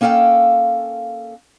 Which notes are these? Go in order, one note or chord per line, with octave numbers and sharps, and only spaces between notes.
A#3 C#4 A4 F5 G5